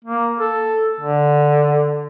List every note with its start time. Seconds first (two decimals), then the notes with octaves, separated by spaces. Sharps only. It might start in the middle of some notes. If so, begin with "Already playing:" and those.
0.05 A#3
0.40 A4
1.01 D3